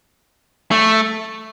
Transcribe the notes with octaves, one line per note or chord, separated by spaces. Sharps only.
A3